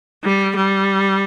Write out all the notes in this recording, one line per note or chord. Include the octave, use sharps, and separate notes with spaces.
G3
G3